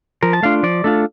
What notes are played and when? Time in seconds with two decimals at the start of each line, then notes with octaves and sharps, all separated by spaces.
0.23 F3 A#4
0.33 A5
0.42 A3 D4 F4 F5
0.63 F3 D5
0.84 A3 D4 F4 A4